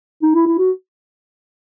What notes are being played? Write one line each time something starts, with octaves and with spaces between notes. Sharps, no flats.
D#4
E4
E4
F#4